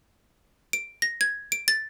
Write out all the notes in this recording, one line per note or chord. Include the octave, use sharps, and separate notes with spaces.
D7
A#6
G#6
D7
A6